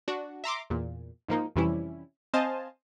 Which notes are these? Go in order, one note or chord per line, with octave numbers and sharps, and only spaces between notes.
D4 F#4
E5 A#5 C6 D6
E2 A#2
G#2 F3 A#3 D#4
F2 C3 E3 G3 C#4 E4
C4 C5 D#5 F5 G#5 A5